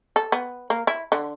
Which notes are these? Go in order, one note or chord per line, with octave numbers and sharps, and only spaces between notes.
A4
B3
A#3
E4
D3